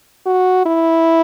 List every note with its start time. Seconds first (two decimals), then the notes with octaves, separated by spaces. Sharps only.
0.26 F#4
0.65 E4